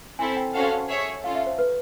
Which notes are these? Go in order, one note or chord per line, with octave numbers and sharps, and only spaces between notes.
C4 E4 A4 G#5
G5
C#4 F#4 A4 C5 F5 F#5
G#4 C#5 E5
C#4 F4 A4 F5
E5
C5
B4